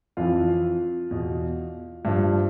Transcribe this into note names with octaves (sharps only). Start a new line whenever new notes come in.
F2 E3 F4
E2 B2
G2 F3